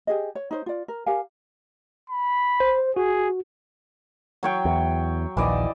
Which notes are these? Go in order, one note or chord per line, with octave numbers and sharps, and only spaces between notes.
G4 G#4 D#5
C#5
D#4 C5 C#5
F4 D5
A#4
G4 A#4 F5 G#5
B5
C5
F#4 G#4
F#3 C#5 G5
E2
A#1 D#2 E3 D5 D#5